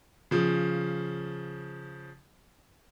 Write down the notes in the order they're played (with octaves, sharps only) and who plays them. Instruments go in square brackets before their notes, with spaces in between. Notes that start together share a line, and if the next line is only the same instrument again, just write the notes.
[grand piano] C#3 F3